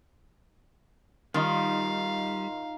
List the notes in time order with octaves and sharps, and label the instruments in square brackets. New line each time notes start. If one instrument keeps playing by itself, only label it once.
[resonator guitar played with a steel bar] D#3 [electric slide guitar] G3 [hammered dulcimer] D#4 F4 C6 [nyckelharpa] F5